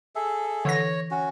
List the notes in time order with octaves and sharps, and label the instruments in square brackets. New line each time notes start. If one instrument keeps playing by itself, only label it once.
[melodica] G#4 A4 E5
[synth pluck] D3 E3 A#6 [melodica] C#5
[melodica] C#4 F#4